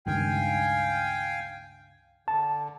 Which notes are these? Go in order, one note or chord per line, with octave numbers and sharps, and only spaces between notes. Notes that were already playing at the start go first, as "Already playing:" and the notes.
C#2 G2 D#3 F5 G5 G#5
D3 A5